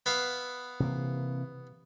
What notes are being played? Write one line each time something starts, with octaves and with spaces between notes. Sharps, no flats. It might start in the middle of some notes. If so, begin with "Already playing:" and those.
B3 E5 F5
C3 E3 A#3